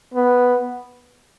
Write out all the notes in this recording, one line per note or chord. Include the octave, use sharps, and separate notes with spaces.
B3